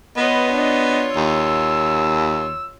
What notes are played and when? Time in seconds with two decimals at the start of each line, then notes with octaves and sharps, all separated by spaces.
0.17 B3 F4 B4 C#5 D#5
0.53 D4 D#5
1.16 D#2 E6